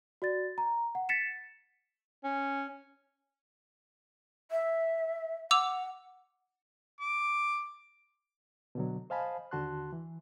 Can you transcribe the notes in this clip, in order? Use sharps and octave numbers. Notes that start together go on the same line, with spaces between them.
F#4 D5 A6
A#5
F#5
A6 B6 C#7 E7
C#4
E5
F#5 D6 E6 F7
D6
B2 D3 F#3
C5 D#5 F5 G#5 A5 B5
D#2 D3 F#4 A5 C6 F#6
E3